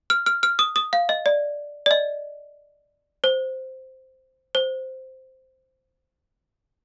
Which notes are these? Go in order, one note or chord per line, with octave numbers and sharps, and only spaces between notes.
F6
F6
F6
D#6
D#6
F5
D#5
D5
D5
D#5
C5
C5